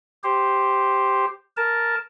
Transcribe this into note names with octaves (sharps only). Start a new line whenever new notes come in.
G4 C5
A#4 A5